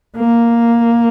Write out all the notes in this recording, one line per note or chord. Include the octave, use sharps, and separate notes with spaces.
A#3